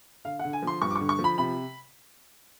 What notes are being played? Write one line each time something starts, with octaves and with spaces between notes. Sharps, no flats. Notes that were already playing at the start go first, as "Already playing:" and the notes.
D3 F5
D3 F#5
G#5
F3 C6
G2 C#6
D6
C#6
D3
C#6
F3
B5
C3 B5